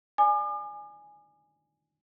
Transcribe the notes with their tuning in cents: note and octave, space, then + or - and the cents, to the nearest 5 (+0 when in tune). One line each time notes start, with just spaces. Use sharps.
D5 +0 G#5 +0 D6 +45